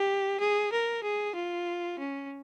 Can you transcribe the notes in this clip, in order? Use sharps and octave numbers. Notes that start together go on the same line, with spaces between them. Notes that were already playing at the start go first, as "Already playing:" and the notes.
Already playing: G4
G#4
A#4
G#4
F4
C#4